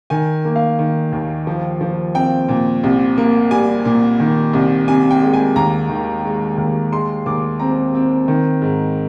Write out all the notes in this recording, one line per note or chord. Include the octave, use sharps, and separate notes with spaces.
D#3 G#5
A#3
F5
D#3
D#2
F3
F3
C4 G5
A#2
C2
A#3
G3 G#5
A#2
D#3
C2
C3 G#5
G5
G#3
G#5
D#2 A#5
D#3
G#3
D#2
G#3 C6
D#2 D6
C4 A#5
C4
D#3
G#2